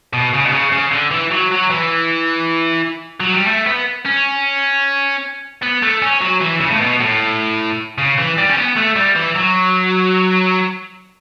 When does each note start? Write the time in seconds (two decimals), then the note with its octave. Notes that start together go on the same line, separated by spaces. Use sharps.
0.13 B2
0.33 C#3
0.45 B2
0.53 C#3
0.72 C#3
0.91 D3
1.11 E3
1.31 F#3
1.51 F#3
1.70 E3
3.20 F#3
3.33 G3
3.47 A3
3.67 B3
4.06 C#4
5.62 B3
5.82 A3
6.02 C#4
6.21 F#3
6.41 E3
6.61 C#3
6.71 A2
6.81 B2
7.00 A2
7.98 C#3
8.18 E3
8.38 G3
8.49 C#4
8.57 B3
8.76 A3
8.96 G3
9.16 E3
9.35 F#3